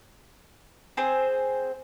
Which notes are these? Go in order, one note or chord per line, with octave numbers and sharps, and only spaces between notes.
C4 G#4 C5